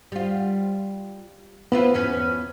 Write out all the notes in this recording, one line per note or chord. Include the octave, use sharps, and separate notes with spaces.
G3 F4
B3 E4 F4 B4
E2 C#4 B4